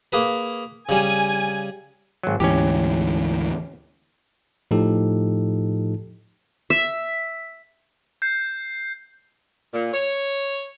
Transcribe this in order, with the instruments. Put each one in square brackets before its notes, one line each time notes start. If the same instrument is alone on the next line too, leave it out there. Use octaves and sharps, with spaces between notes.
[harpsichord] A#3 G#4 B4
[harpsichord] C#3 G3 [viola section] G#5
[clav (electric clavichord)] G#1 F#3
[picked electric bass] D2 G#2 E3 [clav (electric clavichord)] C#4 G4
[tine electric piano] A2 F3 D#4 G4 A4
[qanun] E5
[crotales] G6 C7
[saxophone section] A#2
C#5